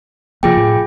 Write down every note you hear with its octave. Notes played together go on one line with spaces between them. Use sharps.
C3 F3 A#3 F4 G#4 G5
A2